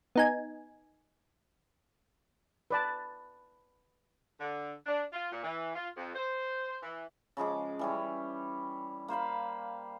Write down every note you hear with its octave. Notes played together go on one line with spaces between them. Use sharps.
B3 D#4 G#5
B4 D5 A5
D3
D4
F4
A#2
E3
F4
F2
C5
E3
C#3 F3 G#3 D6
E3 G3 C#4
A#3 C5 F5 B5